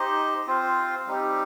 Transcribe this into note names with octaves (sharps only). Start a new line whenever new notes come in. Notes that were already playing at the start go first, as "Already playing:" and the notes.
Already playing: D#4 G4 C5 D#5
C4 F4 C5 F5
G3 C4 D#4 G4